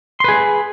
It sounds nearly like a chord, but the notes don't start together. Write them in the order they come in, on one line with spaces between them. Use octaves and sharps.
C6 B4 G#4